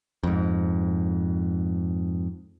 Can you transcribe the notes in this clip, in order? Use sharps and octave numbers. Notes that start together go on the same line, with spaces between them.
F2 G#2